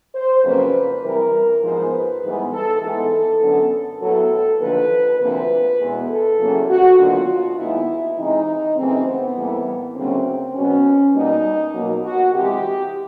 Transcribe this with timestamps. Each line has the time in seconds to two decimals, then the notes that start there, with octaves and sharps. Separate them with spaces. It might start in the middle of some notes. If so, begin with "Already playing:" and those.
0.14 C5
0.43 F2 C#3 F#3 A#3 B4
1.03 C3 E3 G3 A#4
1.62 G#2 F3 G#3 B3 C5
1.92 B4
2.23 G#2 E3 G3 B3
2.52 A4
2.81 G#2 E3 G#3 B3 A4
3.41 F#2 D3 F#3 B3
4.00 A2 F#3 B3 A4
4.60 D#2 D3 F3 B4
5.19 D2 C3 F3 A#3 B4
5.79 E2 B2 G#3 B3
6.09 A4
6.38 E2 C#3 F#3 A#3
6.68 F#4
6.97 D#2 D3 F#3 B3 F4
7.57 D#2 D#3 G#3 B3 E4
8.17 C3 E3 G#3 D#4
8.76 F#2 C#3 E3 A3 C4
9.06 B3
9.36 A2 E3 G3 A#3
9.95 D2 C#3 F#3 A#3 C4
10.55 B2 F#3 B3 C#4
11.14 B2 G3 A#3 D#4
11.74 B2 F#3 A#3
12.03 F#4
12.33 C3 E3 G#3 G4